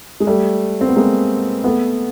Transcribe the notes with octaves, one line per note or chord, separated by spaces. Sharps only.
G#3
G3 A3
C4
B3
G#3 A#3
A3 B3